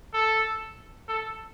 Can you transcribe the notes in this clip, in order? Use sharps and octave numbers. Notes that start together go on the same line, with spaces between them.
A4
A4